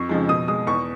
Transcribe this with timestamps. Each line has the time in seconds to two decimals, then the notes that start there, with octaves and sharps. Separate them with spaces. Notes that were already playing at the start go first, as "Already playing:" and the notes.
Already playing: F2 C#6
0.09 C#3 F3 G#3
0.28 B2 D#6
0.48 G#3 D#6
0.67 E2 C#6